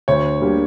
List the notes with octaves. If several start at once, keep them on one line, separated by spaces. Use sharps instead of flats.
D2 C#5
D3 G3 A#3